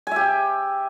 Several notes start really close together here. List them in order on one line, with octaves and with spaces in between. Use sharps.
G#5 E5 G4